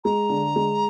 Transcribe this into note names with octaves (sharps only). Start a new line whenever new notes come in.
G#3 A#5
D3
G#3